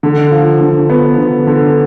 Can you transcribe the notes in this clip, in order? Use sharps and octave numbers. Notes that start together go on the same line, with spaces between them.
D3
F3
D3
B3
D3
D3